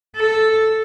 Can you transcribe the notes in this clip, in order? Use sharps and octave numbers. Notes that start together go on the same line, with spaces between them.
A4